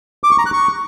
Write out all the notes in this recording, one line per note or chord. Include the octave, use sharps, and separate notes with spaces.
D6
C#6
A#5
F#6
C#6